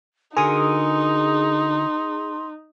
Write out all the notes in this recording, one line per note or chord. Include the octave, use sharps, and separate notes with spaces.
D3 D#4 F#4 G#4 A#4 C6 D#6